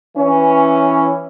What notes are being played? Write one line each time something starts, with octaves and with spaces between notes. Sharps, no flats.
E3 C#4